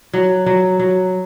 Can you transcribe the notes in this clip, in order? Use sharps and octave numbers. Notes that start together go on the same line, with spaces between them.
F#3
F#3
F#3